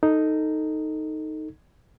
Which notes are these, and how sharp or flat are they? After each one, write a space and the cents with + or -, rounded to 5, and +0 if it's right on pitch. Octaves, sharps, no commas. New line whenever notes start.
D#4 +0 A4 +15